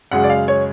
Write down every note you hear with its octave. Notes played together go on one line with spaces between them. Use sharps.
F#2 C#3 G#3 F#5
D5
F5
C#5